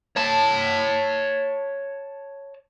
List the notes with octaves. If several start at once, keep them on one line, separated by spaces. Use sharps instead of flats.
C#5 A5